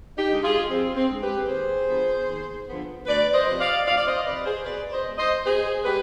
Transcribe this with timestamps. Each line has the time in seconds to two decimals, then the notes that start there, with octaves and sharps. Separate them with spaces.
0.16 D#4 G4
0.30 D3 G#3
0.43 F4 G#4
0.69 F2 C4
0.95 C4
1.08 D3 G#3
1.21 G4 B4
1.48 D#2 G#4 C5
1.87 D3 F3 B3
2.27 D#2
2.68 D3 F3 B3
3.06 D2 B4 D5
3.33 C5 D#5
3.47 C3 F3
3.60 D5 F5
3.86 D2 D5 F5
3.97 D5
4.06 C5 D#5
4.25 C3 F3 B4 D5
4.46 G#4 C5
4.65 B2 B4 D5
4.92 C5 D#5
5.06 G#3 B3
5.18 C5 D#5
5.45 B2 G#4 C5
5.84 G#3 G4 B4